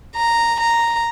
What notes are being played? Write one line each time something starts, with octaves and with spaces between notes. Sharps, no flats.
A#5
A#5